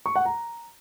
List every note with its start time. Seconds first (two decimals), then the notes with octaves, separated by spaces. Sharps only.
0.06 C#6
0.16 F#5
0.25 A#5